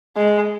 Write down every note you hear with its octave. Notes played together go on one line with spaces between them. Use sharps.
G#3